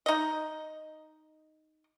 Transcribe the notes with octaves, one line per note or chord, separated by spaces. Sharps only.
D#4 D#5